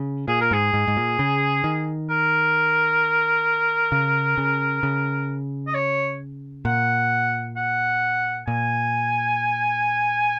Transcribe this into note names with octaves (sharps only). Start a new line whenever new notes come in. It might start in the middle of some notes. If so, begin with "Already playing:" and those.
Already playing: C#3
A#2 G#4
A#4
G#2 G#4
G#2
G#2
A#2
C#3
D#3
A#4
C#3
C#3
C#3
D#5
C#5
A#2 F#5
F#5
A#2 G#5